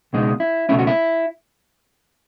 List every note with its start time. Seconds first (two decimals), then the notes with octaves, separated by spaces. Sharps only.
0.13 C#2 B2 G#3 D#4
0.40 E4
0.69 C#2 B2 A3 C#4 E4
0.79 F#4
0.87 E4